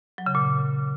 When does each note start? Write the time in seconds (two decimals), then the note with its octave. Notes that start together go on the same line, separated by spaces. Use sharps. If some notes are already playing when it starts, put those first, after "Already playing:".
0.18 F#3
0.26 C#3
0.35 A#2